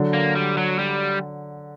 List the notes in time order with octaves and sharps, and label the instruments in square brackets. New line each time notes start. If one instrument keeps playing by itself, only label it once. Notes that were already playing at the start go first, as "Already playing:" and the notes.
Already playing: [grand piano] D3 F#3
[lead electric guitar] A#3
G3
F#3
G3